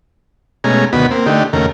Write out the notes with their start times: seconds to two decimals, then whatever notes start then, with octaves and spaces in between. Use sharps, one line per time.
0.64 B2 G#3 A3 C#4 G#5 A#5
0.93 D2 B2 D#3 B3 F#4 B5
1.11 A#3 C4
1.26 D3 A3 D#4 G4
1.53 D#2 C#3 A3 A#4